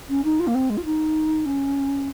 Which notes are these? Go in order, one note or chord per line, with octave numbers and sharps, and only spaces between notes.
C#4
D#4
F4
A#3
C4
G#3
F4
D#4
C#4